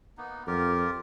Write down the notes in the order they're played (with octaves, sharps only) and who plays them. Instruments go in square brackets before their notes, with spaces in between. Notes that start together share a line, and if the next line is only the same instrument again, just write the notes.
[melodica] A#3 B3 D#4
[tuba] F2 [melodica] F4 G4 A#4